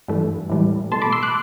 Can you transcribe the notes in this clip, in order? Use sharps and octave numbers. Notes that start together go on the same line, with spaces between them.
G2 E3 A3
A2 E3 G3
B2 A3 A5 C6
B5 D6
C6 E6
D6 F#6